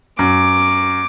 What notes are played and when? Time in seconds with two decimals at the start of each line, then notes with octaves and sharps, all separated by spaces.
0.19 F#2 D6